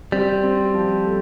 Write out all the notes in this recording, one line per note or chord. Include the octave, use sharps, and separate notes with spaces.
G3 C4
C4
F3
A3